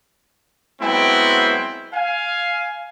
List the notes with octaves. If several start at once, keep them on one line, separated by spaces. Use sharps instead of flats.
F#3 G#3 B3 C4 E4 G5
F5 G#5